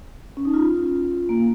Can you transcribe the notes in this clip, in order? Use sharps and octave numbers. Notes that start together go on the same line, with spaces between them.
C#4
D#4
F4
A#3